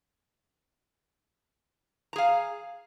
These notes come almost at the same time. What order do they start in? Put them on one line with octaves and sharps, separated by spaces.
A#5 G#4 F5